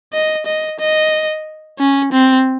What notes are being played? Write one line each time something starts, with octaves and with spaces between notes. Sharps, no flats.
D#5
D#5
D#5
C#4
C4